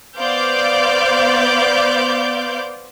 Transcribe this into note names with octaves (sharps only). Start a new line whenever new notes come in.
B3 C5 D5 F5 D6 G6